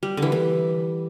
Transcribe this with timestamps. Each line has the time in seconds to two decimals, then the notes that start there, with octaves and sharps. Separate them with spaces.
0.03 G3
0.17 D3 E3
0.32 E3